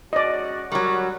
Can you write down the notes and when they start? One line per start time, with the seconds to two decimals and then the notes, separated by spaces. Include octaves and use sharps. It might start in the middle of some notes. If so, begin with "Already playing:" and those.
0.13 G#3 C#4 F#4 D5 D#5
0.72 F#3 G3 F#4 A#4 C#6